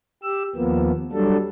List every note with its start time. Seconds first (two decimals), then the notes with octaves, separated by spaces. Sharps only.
0.23 G4 E6
0.55 D#2 F3 A#3 B3
1.13 F#3 G3 D4 A4